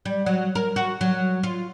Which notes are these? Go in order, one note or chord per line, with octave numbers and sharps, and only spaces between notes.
G3
F#3
A#4
F#4
F#3
F4